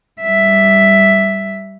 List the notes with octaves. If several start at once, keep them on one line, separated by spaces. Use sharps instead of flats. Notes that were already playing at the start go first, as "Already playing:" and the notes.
G3 E5